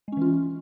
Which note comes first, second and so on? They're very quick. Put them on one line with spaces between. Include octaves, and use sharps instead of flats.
G#3 C#4 E3 F4